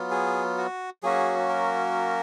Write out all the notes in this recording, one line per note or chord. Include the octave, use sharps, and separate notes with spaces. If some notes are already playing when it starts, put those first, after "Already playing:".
Already playing: F#3 B3 F4
G#4
F#4
F#3 A#3 C#4 F#4 G#4
A#4